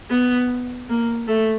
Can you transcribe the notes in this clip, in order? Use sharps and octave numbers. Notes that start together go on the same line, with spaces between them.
B3
A#3
A3